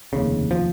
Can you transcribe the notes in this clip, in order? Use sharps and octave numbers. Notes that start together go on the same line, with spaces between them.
F1 D#2 C#3
F3